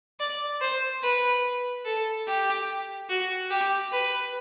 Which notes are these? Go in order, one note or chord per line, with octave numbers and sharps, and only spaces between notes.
D5
C5
B4
A4
G4
F#4
G4
B4